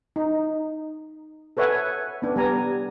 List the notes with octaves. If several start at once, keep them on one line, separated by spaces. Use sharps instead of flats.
D#4
A4 B4 C#5 E5 F#5 G#5
B3 D4
G3 B3 G#5 A#5